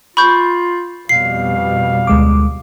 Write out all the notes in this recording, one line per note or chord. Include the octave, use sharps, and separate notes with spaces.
F4 B5 C#6 G6
F2 B2 G3 F5 C7
D2 G#3 D6